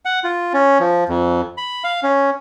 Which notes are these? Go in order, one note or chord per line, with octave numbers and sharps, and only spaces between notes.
F#5
F4
C#4
F3
F2
B5
F5
C#4